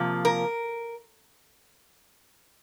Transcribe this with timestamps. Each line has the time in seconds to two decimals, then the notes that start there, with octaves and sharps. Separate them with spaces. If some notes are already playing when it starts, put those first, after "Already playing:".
Already playing: C3 F3 A#3
0.25 A#4